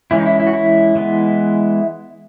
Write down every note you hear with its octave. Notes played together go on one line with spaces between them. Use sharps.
E3 G#3 C#4 E4
D#4
E4
E4
F#4
E4
E3 G#3 B3